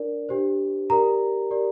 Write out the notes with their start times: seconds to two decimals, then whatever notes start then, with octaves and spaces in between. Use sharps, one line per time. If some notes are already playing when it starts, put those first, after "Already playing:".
Already playing: D4 A#4 D5
0.29 D4 G4 C5
0.90 G4 A#4 D5 A#5
1.51 G4 A#4 D5